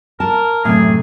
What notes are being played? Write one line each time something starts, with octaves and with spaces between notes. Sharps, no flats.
A#4 A5
F#2 A2 C3 A3 G#4